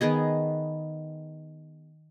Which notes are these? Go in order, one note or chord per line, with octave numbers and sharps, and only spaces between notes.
D#3 B3 G#4 D#5